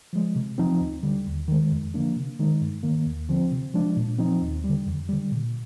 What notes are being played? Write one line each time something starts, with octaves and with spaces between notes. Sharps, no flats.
F3 G#3
C3
F3 C4 D#4
D2
D3 G3
D#2
D#3 G#3
F2
D3 F3 A#3 D4
C3
D#3 G#3 D#4
G2
D#3 A#3
D#2
D3 F3 C4
C3
F3 G#3 D4
A#2
F3 C4 D#4
D#2
D3 G3
F2
D3 G3
A#2